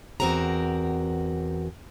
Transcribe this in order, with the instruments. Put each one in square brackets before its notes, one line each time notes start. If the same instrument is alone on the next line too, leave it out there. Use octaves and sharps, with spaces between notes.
[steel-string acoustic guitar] E2 G#2 C4 F#4 A#4 A#5